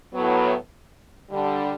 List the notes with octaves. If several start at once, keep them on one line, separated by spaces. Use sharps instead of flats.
A2 F#3 B3
D3 G3 D4